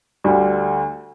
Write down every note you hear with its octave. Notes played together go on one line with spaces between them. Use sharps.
D2 D3 G3